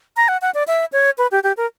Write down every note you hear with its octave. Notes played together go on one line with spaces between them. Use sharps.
A#5
F#5
F#5
D5
E5
C#5
B4
G4
G4
A#4